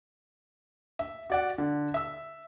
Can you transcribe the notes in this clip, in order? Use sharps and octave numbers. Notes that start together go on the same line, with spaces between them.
E5
F#4 D5 F#5
D3
E5 E6